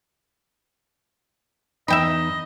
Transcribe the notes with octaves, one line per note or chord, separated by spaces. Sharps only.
E2 D#4 D#5 E5 G5 B5